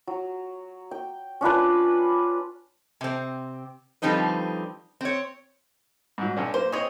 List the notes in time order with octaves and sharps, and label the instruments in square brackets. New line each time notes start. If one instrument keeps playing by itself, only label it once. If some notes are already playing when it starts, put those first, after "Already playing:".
[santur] F#3
G5
C#4 D4 F4 B4
[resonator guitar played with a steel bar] C3 C4
D3 F3 G3 C4 D#4 B4
C4 C#5
[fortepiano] G#2 F#3
B1 C#4 D4
[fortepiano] A#3 [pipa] C5
[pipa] C4 G#4 [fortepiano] C#5 D#5